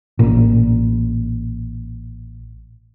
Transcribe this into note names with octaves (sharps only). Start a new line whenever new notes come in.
A1 A#2